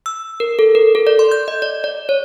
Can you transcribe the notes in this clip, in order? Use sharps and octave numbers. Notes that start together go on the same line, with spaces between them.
E6
A#4
A4
A#4
A4
D5
C6
G6
D#5
D5
D5
C#5